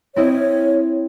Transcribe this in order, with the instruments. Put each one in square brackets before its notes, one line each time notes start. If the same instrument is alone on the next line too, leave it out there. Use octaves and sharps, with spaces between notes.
[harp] C4 E4 D#5 [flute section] C#5